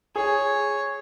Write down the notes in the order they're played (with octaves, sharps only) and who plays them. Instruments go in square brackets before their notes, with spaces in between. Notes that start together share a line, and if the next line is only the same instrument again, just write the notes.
[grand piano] G#4 [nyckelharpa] C#5